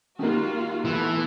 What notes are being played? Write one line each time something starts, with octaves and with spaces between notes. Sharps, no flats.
D#3 G3 A#3 F4 F#4
E3 A3 B3